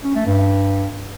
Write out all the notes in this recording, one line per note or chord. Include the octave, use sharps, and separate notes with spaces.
C#4
A3
G2